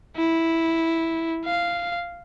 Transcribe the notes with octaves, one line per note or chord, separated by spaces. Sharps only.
E4
F5